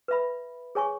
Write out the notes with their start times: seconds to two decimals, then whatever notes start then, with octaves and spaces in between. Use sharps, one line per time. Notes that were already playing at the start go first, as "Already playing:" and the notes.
0.08 B4 E5 B5
0.75 G#4 C#5 G#5 C#6